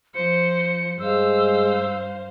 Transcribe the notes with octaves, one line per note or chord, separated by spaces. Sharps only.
F3 C5 C#7
G2 G#3 C5 F5 E6